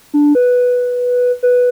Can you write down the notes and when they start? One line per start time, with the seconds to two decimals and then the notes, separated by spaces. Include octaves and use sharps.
0.14 D4
0.35 B4
1.43 B4